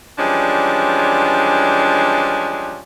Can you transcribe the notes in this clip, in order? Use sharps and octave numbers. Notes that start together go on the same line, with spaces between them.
E3 F3 G3 G#3 C#4 D4